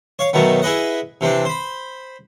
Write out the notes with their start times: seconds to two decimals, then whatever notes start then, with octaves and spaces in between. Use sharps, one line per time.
0.19 C#5 F5
0.33 B2 D#3 F#3 A3 B3
0.62 E4 G#4 B4 D#5 F#5
1.21 C3 E3 C4 D4
1.45 C5 B5